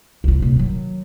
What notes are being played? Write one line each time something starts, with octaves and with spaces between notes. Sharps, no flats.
C2 F4
A#1 C3
D#3 F#3